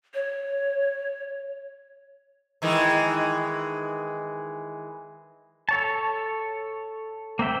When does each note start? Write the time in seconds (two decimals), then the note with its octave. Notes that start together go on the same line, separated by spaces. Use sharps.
0.14 C#5
2.62 D#3 E3 G#3
5.69 A4 C#5 A5
7.39 A#3 C4 E5 G5